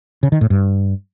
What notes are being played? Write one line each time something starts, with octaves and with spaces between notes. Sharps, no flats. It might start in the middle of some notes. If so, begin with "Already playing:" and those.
C#3
D#3
A2
G2